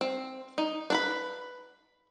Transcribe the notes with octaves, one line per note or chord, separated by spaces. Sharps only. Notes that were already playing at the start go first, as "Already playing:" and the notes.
C4
D#4
D4 B4 B5